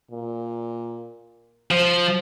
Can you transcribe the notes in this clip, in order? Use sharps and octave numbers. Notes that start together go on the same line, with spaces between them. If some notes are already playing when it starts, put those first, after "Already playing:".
A#2
F3 C5